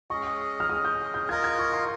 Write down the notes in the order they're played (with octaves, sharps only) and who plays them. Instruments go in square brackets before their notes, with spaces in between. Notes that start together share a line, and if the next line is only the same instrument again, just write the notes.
[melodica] G#3 C#4 G#4 D#5 [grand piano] C#6
[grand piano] F6
[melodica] G#3 C#4 G#4 D#5 [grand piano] D#6
[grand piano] G6
G6
[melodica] F4 A#4 D#5 [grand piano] G#6
[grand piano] G#6
C#6
C6